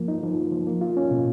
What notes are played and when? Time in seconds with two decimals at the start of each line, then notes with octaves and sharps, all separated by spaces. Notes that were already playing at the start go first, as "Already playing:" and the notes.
Already playing: F3 A#3
0.08 D#4
0.23 F3
0.38 A#3
0.52 F3
0.67 A#3
0.81 F4
0.97 C#4
1.11 B2